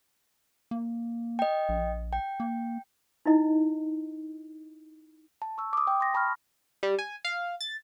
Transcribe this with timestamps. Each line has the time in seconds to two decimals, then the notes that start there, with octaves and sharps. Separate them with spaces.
0.71 A#3
1.39 D#5 G5
1.69 A#1
2.13 G5
2.40 A#3
3.26 D#4 E4 D#5
5.42 A5
5.58 C#6 E6
5.73 D6 D#6
5.87 G5
6.00 C6 A#6
6.14 A5 B5 C#6 D#6 F6
6.83 G3
6.99 G#5
7.25 F5
7.61 A6